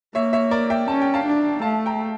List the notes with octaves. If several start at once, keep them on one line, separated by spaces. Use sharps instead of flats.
A#3 C#5 E5
C#5 E5
A#4 D5
E5 G5
C#4 A5
G5
F5 A5
D4
A3 F5 A5
G5 A#5